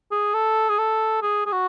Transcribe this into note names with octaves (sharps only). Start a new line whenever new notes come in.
G#4
A4
G#4
A4
G#4
G#4
F#4